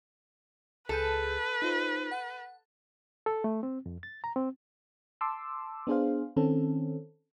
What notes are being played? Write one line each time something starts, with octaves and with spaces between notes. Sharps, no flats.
C#2 G#4 A4 B4 G6
D#4 F4 C5
F#5
A4
A3
C4
F2
A6
A#5
C4
A5 C6 D6 E6
B3 D4 G#4 C5 F5
D#3 C4 C#4 A4